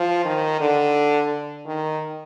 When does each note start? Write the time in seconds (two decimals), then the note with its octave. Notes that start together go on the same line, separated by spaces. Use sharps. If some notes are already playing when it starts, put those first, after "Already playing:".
Already playing: F3
0.25 D#3
0.60 D3
1.66 D#3